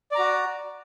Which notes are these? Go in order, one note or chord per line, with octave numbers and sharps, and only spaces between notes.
F#4 D5 A#5